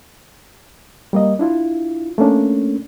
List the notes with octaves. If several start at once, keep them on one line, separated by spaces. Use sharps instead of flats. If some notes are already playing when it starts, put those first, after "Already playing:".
G3 A#3 D#5
D4 E4 F4
A3 A#3 C#4 D4